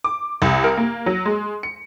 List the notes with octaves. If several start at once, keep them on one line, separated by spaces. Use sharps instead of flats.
D6
C2
A#4
A#3
F#3
G#3
C#7